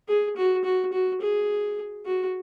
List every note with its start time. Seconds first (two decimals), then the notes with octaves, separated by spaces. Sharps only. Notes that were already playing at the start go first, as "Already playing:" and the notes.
0.08 G#4
0.36 F#4
0.65 F#4
0.93 F#4
1.21 G#4
2.06 F#4